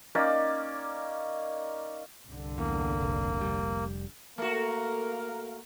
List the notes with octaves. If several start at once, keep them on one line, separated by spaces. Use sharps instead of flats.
A#3 C#4 D#4 D5
C2 G2 D3
E2 A#3
F1
F1 G3
A3 A#3 F#4 A#4